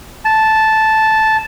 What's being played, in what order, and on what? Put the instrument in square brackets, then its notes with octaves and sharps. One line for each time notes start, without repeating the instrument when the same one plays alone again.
[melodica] A5